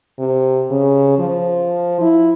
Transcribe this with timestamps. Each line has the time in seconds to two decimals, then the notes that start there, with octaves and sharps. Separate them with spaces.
0.19 C3
0.71 C#3
1.19 F3
2.01 E4